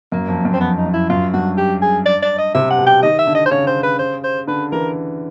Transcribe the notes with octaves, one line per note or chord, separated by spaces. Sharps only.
F#2 A#3
F2
F#2
C4
F2 B3
D#4
F2
E4
F#2 F4
G2 F#4
G4
G#4
D5
D5
D#5
C3 E5
F#5
B2
G5
D#3 D#5
E5
D3
D#5
C5
C#3 C#5
C5
B4
C5
C5
D3 B4
E3 A#4